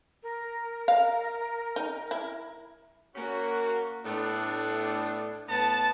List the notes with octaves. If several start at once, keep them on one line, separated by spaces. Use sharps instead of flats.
A#4
F5
D#4
E4
A#3 C#4 F#4
A2 A3 B3 D4
A2 B3 A5